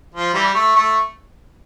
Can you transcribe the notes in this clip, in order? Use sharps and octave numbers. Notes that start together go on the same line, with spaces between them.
F3
E3 G3
A3
A3